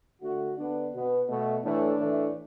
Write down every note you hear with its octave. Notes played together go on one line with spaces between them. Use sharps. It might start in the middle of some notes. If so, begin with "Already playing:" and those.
D3 A3 F#4
D3 B3 D4
B2 B3
B2 A3
A2 E3 A3 D4
A2 E3 A3